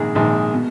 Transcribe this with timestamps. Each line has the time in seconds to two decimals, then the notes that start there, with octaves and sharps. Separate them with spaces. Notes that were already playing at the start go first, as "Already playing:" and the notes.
Already playing: A#1 G#2 D#3 G#4
0.15 A#1 G#2 D#3
0.54 B2